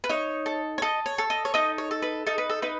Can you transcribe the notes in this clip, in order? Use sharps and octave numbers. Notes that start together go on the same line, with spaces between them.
B4
D#4 C#5
A4
C#5
A4 D#5
C#5
A4
D#5
C#5
D#4 D#5
C#5
A4
B4
D#4 A4
B4
A4
D#4 B4